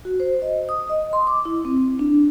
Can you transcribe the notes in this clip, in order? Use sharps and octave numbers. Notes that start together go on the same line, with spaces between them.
F#4
C5
D#5
D#6
D#5
C6
D6
E4
C4
D4